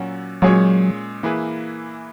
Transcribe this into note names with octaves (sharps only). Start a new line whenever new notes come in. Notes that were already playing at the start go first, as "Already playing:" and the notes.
Already playing: A#2 F#3 C#4 F#4
A#2 F#3 G#3 C#4 G#4 C#5
E3 A#3 E4 G#4 B4